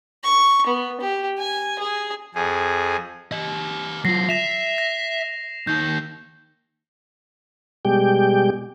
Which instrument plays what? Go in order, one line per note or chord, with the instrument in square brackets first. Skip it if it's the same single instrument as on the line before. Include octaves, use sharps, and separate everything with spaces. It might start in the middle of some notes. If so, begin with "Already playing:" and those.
[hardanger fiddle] C#6
B3
G4
G#5
G#4
[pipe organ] F2 G#4
[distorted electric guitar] G4 D#5
[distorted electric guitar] F#3 F4 [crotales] A#6 C7
[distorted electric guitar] E5 [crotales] A#6 E7 F7
[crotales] A#6
[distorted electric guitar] D#2 D#3 [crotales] G6
[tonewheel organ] B2 G3 G#3 G4 G5